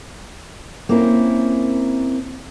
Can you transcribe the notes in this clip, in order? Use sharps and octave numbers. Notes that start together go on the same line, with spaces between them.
A#3 C4 C#4 E4 A#4